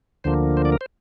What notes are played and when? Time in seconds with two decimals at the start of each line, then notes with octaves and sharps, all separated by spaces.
0.24 D2 D3 F3 A#3 C5
0.57 C5
0.65 D5
0.72 A#4
0.81 C5